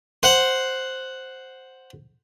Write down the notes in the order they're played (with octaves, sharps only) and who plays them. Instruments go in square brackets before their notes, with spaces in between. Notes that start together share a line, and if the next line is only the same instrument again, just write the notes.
[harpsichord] C5 F#5